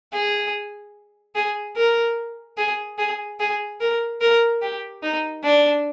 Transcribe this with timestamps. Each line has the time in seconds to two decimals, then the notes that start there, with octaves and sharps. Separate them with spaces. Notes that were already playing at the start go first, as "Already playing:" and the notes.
0.13 G#4
1.35 G#4
1.77 A#4
2.58 G#4
2.98 G#4
3.40 G#4
3.81 A#4
4.21 A#4
4.62 G4
5.03 D#4
5.43 D4